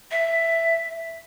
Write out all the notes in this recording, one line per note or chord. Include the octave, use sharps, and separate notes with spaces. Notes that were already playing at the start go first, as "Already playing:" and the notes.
E5